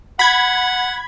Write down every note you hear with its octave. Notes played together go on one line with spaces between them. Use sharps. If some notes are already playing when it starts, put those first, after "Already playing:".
F#5 B5 G#6